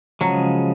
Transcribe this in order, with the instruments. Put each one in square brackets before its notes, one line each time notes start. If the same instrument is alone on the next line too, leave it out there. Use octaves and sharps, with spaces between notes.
[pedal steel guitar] C#3 F3 G#3 [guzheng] F#3